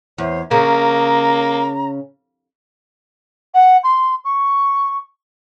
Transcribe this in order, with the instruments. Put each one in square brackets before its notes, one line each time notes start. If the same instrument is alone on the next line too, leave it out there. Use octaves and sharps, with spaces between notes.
[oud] E2 [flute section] C5 C#5 E5
[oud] C#3 [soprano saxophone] A#3 [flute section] A#5
[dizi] F#5
C6
C#6